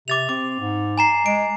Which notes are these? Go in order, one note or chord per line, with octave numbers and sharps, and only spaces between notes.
C3 D6 A6 F7
C4 D6
G#2
G#5 A#5 C7
G#3 D7